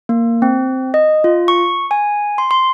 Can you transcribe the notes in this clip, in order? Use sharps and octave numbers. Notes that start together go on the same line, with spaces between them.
A#3
C4
D#5
F4
C#6
G#5
C6
C6